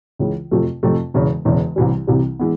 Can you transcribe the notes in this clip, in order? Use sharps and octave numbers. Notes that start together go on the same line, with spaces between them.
C#2 C#3 E3 G#3
F2 C3 F3 A3
F2 C3 F3 A3
E1 E2 C#3
E1 E2 C#3
C2 C3 E3 G3
C2 C3 E3 G3
E3 G#3 B3